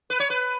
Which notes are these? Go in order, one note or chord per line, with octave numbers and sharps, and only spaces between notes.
B4
C#5
B4